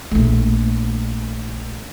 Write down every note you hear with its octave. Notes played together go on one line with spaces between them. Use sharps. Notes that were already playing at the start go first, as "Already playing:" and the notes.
A#1 A3